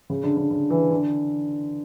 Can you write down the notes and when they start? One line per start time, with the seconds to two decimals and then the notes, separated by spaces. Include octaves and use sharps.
0.10 C#3
0.24 D3
0.37 D3
0.51 D3
0.70 E3
0.91 D3